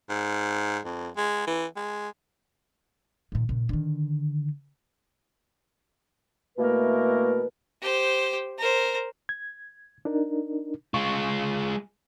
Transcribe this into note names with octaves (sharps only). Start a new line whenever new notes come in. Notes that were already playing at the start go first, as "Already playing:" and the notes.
G#2
F2
G#3
E3
G#3
A#2 D#3
A#2 C#3
D3 D#3
B2 E3 A3 A#3 A#4 B4
G4 C5
A#4 C5
G#6
D4 D#4 A#4
G#3 F4 C#6